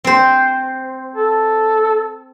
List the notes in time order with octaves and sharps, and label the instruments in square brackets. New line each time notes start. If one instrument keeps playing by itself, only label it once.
[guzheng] C4 C5
[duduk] A4